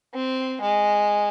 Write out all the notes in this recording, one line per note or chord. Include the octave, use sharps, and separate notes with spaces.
C4
G#3